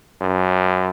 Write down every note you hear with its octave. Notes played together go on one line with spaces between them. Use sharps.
F#2